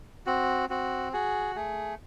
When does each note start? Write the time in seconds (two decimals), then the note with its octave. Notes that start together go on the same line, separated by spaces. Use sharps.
0.26 C4 F#4
0.70 C4 F#4
1.13 F#4 G#4
1.55 A3 G#4